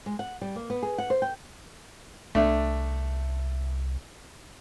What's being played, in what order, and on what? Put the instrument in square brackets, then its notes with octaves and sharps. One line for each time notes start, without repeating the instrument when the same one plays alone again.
[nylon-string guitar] G#3
F#5
G3
A#3
B3
G#4
F#5
C5
G5
[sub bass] C2 [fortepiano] A3 D4